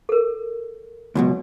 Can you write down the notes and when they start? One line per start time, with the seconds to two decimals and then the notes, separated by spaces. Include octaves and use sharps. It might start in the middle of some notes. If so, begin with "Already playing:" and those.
0.09 A4 A#4
1.15 C#2 F#2 B2